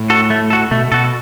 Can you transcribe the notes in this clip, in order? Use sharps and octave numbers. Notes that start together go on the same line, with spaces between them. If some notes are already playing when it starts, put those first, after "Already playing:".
Already playing: A2
F#4 A4
A3
F#4 A4
B2 A3
B2 F#4 A4